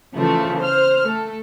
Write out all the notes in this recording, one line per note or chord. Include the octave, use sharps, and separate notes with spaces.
C#3 E3 F3 A3
C5 F6
A3 A4